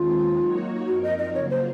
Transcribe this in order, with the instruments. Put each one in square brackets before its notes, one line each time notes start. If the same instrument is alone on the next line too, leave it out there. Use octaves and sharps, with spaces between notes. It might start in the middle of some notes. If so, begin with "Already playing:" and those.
Already playing: [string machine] D#2 D#3 G#3 C4 [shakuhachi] F4
[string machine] F#3 A#3 D#4 F#4 C#5
[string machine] F#2 F3 C4 D#4 A#4 [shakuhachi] F#4
[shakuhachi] D#5
D#5
[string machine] C#3 F#3 A#3 F4 [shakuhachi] C#5
[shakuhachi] C5